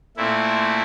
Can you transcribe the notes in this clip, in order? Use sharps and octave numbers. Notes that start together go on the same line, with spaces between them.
A#2 A3 C4 E4